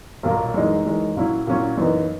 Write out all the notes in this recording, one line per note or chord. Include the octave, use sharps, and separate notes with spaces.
B1 A#2 F#3 A#3
F#2 E3 G#3 D#4
F#2 E3 G#3 D#4
A#2 F#3 C#4 E4
A#2 F#3 C#4 E4
F#2 E3 B3 D#4